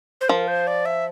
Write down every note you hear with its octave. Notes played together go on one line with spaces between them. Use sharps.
C5
F3 A#4
C5
D5
E5